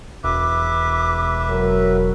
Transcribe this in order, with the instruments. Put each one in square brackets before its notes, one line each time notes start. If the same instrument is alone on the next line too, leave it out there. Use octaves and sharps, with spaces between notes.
[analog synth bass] E1 [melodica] B4 E5 [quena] D6
[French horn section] F#3 A#4